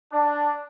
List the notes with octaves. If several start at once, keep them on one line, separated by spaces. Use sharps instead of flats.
D4